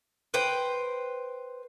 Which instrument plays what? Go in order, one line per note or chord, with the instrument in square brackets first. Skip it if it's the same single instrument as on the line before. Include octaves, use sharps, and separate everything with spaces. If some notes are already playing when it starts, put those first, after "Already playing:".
[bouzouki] B4 C5 G5